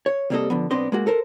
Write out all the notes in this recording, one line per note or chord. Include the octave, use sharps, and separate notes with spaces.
C#5
C3 G3 A#3 C4 A4 D#5
D3 F3 B3
B1 B3 C4 D4 D#5 C6
G#3 A#3 F#4
A4 A#4 C5